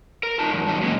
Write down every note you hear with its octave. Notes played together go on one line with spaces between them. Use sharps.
A#4
D#4 F4 A5
E2 G2
G2 D3 D#3 F#3 G3
A#2 E3 G#3 C#4